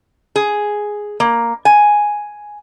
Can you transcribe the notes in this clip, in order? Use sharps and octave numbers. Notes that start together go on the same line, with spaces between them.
G#4
A#3
G#5